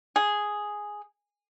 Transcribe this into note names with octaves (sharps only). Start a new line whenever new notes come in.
G#4